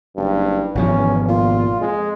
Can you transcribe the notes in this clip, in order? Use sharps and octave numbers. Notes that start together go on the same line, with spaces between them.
F#1 G2
G#1 E2 B2 F3 C#4
A#2 F4
F2 G#3